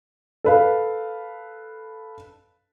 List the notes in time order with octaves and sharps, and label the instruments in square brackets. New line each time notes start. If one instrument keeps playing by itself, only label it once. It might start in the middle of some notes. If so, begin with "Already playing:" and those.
[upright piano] A4 B4 F5